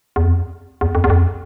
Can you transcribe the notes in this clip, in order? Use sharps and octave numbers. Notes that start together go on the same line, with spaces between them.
E2
F2
E2
F2
E2
F2